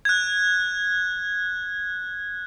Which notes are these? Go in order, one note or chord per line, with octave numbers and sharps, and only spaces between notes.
F#6 G#6